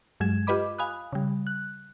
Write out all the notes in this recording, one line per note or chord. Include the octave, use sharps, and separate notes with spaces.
G2 F#3 G#3 G#6 E7
F4 G4 B4 D#5 B5 D6
F5 G#5 B5 D#6 F#6
C#3 G3
F#6